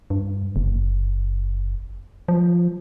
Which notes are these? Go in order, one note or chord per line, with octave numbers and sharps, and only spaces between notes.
G2
F#1
F3